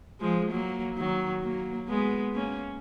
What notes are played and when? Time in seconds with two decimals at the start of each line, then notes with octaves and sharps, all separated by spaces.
0.20 F3 G#3
0.51 F#3 A#3
0.96 D#3 F#3
1.43 F#3 A#3
1.88 G#3 B3
2.34 A#3 C#4